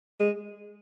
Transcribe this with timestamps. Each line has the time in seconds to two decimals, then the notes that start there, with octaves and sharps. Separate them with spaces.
0.20 G#3